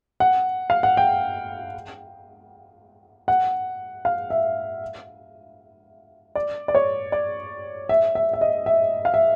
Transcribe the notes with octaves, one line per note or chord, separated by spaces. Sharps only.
F#5
F5
F#5
G5
F#5
F5
E5
D5
D5
C#5
D5
E5
E5
E5
D#5
E5
F5
E5